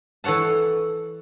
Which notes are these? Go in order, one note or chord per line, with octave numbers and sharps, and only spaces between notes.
E3 A4 C#5 F#5 A5